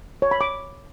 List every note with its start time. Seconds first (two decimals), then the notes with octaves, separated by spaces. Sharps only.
0.22 C#5
0.31 B5
0.41 D6